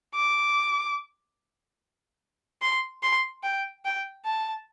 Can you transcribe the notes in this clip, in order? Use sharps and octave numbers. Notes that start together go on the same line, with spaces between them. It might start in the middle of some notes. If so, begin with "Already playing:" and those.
D6
C6
C6
G5
G5
A5